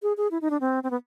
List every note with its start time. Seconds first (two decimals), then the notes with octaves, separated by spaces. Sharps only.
0.03 G#4
0.17 G#4
0.31 E4
0.42 D#4
0.50 D4
0.61 C4
0.83 C4
0.91 B3